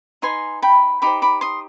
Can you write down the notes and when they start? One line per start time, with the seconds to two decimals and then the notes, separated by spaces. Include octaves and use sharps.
0.22 D#4 B4 D#5 G#5 C6
0.62 G5 B5
1.02 D#4 G4 C5 B5 D6
1.22 B5 D6
1.41 C6 D#6